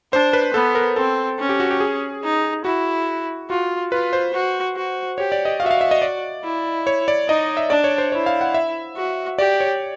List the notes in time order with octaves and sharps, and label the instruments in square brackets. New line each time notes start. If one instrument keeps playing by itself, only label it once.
[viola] D4 [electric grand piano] C5
[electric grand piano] B4
[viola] B3 [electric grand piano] A4
[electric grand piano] A#4
[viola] C4 [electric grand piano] A4
[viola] C#4
[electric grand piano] G4
F#4
G4
G#4
[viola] D#4
[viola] E4 [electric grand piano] F#4
[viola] F4 [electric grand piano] F#4
[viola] F4 [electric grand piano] B4
[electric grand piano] C5
[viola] F#4
F#4
[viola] G4 [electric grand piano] C#5
[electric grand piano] D5
D#5
[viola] F#4 [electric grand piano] F5
[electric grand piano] E5
F5
E5
D#5
D5
[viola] E4
[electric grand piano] C#5
D5
[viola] D#4 [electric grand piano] D#5
[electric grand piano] E5
[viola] D4 [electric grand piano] D5
[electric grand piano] C#5
C5
[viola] E4 [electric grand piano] C#5
[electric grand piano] F5
F#5
E5
[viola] F#4
[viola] G4 [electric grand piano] D5
[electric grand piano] C#5